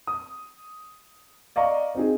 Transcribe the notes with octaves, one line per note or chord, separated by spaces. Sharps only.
D#6
D5 D#5 F5 A#5 C#6
C4 D#4 G#4